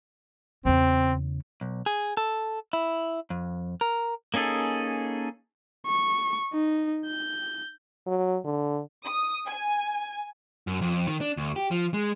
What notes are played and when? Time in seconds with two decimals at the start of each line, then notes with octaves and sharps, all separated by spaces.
0.65 E2 C#3 C4
1.61 B1
1.86 G#4
2.17 A4
2.73 E4
3.30 F2
3.81 A#4
4.34 A#3 C#4 D#4 G#4 A4
5.86 C#6
6.53 D#4
7.06 G6
8.07 F#3
8.45 D3
9.05 D#6
9.47 G#5
10.67 F#2
10.82 F2
11.07 D#3
11.21 D4
11.37 D2
11.56 G4
11.71 F3
11.94 G#3